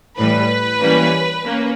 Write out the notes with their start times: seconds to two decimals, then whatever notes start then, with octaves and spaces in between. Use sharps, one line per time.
0.17 A2 E3 G3 B4
0.81 E3 G3 A#3 C#4
1.44 A#3 C#4